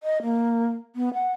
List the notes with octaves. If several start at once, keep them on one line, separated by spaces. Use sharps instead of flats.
D#5
A#3
B3
F#5